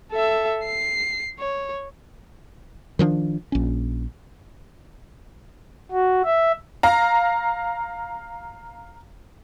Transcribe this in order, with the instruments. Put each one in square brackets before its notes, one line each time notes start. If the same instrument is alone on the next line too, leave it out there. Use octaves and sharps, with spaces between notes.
[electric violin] A4 E5
C7
C#5
[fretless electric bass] D#3 F3 C4 D4
A#1 C#4
[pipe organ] F#4
E5
[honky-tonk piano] F5 A#5